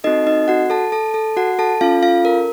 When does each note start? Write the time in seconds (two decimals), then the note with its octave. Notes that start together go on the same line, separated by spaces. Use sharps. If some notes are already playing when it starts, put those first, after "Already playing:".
0.04 C4 D#4 F#4 A4 D#5
0.27 D#4 D#5
0.48 F#4 F#5
0.70 A4 A5
0.92 A4 A5
1.14 A4 A5
1.36 F#4 F#5
1.59 A4 A5
1.81 C#4 F4 A4 F5
2.03 F4 F5
2.25 A#4